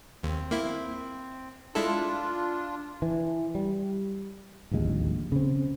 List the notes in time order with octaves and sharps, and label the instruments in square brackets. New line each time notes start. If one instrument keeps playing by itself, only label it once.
[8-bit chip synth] D#2 [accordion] C4
[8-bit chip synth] A#3 E4
[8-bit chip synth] G#3 E4 A4 [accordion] D4 F4
[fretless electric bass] E3
G3
D1 A#1 D#2 G#3
C#3 C4